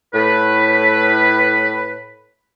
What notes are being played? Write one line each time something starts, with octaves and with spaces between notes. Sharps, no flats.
A2 B4